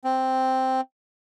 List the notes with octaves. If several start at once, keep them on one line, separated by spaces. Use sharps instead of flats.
C4